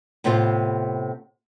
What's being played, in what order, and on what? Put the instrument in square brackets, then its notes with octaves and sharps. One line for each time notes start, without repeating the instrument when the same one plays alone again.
[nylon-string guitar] A2 C3 B3 C4 F4